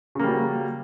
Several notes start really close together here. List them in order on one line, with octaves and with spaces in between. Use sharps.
C#3 A#3 G3 F#3